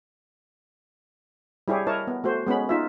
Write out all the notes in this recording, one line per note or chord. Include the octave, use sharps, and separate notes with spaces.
G3 E4 G4 G#4 C#5
E4 A#4 C#5 D#5 A5
B3
A3 F#4 C5
G#3 B3 C#4 B5
D#4 F4 E5